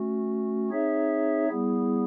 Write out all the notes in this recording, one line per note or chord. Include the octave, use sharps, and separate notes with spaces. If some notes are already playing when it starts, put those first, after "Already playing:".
Already playing: A3 C#4 F#4
C4 D#4 G#4 C#5 E5
G3 B3 E4 G#4